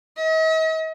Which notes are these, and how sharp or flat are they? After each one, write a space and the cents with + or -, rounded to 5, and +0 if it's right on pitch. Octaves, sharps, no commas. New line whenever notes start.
D#5 +45